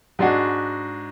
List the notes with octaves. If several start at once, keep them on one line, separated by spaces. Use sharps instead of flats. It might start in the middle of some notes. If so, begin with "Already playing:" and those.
G#2 G#3 D4 F#4